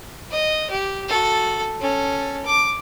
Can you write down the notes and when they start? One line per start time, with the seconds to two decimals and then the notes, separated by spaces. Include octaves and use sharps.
0.31 D#5
0.70 G4
1.09 F#4 A4
1.80 C#4 A4
2.45 D6